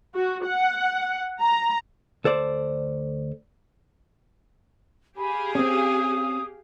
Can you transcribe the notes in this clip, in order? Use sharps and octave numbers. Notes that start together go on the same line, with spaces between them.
F#4
F#5
A#5
D2 A4 C5 D5
G4 G#4 F5 B5
C4 C#4 D#6